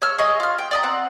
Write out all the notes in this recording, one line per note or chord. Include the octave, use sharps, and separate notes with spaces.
C#5 E6 F6
G#4 C#5 D#5
F4 F6
G5
D5 D#5 A#5
C4 F#5